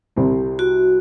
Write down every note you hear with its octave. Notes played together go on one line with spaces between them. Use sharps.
C2 C3 G3 C4
F#4